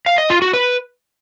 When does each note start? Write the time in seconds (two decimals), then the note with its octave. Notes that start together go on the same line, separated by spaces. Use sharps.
0.06 F5
0.18 D#5
0.30 F4
0.42 F#4
0.54 B4